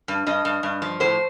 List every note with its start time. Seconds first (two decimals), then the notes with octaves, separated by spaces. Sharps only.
0.08 G2
0.26 G2 D#5
0.45 G2
0.63 G2
0.82 F3
1.00 A2 C5